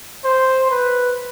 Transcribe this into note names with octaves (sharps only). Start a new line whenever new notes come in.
C5
B4